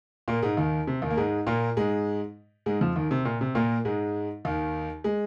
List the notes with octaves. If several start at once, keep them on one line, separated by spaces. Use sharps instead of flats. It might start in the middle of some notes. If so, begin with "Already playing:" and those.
A#2 A#3
G#2 G#3
D#2 D#3
C3
D#2 D#3
A#3
G#2 G#3
A#2 A#3
G#2 G#3
G#2 G#3
F2 F3
D#2 D#3
C3
A#2
C3
A#2 A#3
G#2 G#3
D#2 D#3
G#3